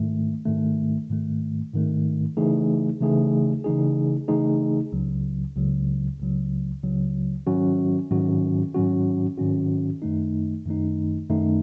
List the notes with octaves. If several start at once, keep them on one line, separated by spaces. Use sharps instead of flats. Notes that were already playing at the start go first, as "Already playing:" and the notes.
Already playing: G#2 D#3 A3
G#2 D#3 A3
G#2 D#3 A3
G#2 D#3 A3
C#3 E3 A3 D#4 G#4
C#3 E3 A3 D#4 G#4
C#3 E3 A3 D#4 G#4
C#3 E3 A3 D#4 G#4
C#2 C#3 F#3
C#2 C#3 F#3
C#2 C#3 F#3
C#2 C#3 F#3
G#2 D#3 F#3 C#4 F#4
G#2 D#3 F#3 C#4 F#4
G#2 D#3 F#3 C#4 F#4
G#2 D#3 F#3 C#4 F#4
F#2 D#3 A3 D#4
F#2 D#3 A3 D#4
F#2 D#3 A3 D#4